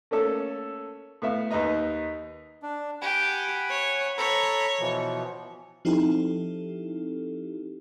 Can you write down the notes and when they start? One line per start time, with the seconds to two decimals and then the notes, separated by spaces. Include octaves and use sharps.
0.11 A3 A#3 C#4 A4
1.22 A2 B3 E5 F5
1.51 D#2 D#4 B4 D#5 A#5
2.63 D4
3.02 G4 F#5 G#5 B5
3.69 C#5
4.18 A4 C#5 A#5 B5
4.80 B2 E3 F3
5.85 F3 C4 D#4 E4 G4 A4